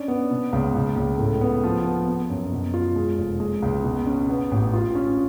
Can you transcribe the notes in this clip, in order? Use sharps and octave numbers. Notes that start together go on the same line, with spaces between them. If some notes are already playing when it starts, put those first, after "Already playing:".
Already playing: C#4 D4
B3
B2
C#2
C#2
C#2
A2
B3
F3
B3
B3
F#2
B2
F4
G#3
F1
G#3
C#2
B2
C#4
B3
A1
F4
C#4